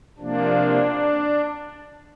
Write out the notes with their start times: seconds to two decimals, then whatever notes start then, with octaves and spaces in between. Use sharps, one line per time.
0.18 C3 F3 A#3 D4